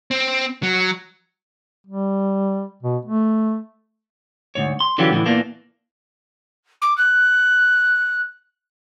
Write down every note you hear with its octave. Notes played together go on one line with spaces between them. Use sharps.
C4
F#3
G3
B2
A3
D2 G#2 C#5
C6
D3 E3 F#3 C#4 F4 G4
A2 D3 E3
E2 A#2 E3 A#3 D4
D6
F#6